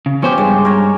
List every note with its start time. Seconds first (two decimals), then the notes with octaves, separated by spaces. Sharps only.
0.06 C#3
0.22 F3 B3 C#4 G4 C5
0.38 G2 G#3
0.65 A#4 C#5